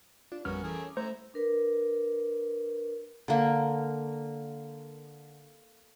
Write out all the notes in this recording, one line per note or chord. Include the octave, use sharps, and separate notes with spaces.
D4 F4
A1 F2 G3 B3 C#4 F#4 A#4 F6
E3 A3 G#4 A#4
D6
A3 E4 C5 A#5
D4 A#4 B4
D3 A#3